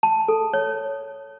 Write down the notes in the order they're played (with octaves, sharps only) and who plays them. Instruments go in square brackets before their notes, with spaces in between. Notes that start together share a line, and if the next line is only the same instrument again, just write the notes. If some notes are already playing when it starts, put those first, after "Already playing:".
[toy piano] A5
A4
C#5